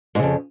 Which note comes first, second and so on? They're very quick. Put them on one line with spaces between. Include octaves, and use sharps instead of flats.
G#2 C#3 F2